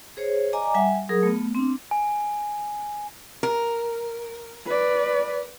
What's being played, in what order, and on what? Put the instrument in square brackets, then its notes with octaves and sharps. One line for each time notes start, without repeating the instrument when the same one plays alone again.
[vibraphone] G#4 C5 C#5
D5 D#5 G#5 A#5 D6
G3 E5 F#5 G#5
F#3 G#4 A#4 D#6
A3 B3
C4 D4
[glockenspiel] G#5
[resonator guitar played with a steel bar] A#4
[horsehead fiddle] B4 D5